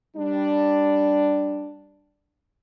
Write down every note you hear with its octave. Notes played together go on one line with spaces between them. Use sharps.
G3 D4